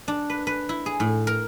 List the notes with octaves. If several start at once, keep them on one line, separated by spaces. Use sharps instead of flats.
D4
B4
B4
E4
G#4
A2
A#4